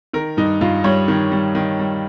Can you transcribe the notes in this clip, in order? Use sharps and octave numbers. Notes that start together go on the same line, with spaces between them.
D#3 A#4
G2 D#4
G2 F4
G3 C#5
D#3
G3
D#3
G3